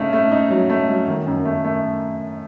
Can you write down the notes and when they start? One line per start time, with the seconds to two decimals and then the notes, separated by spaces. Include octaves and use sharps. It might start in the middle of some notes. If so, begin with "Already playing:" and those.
Already playing: C#3 A3 D#4
0.13 A3
0.31 D#4
0.50 F#3
0.70 A3
0.89 F#3
1.08 D#3
1.27 F#2
1.45 A3
1.65 A3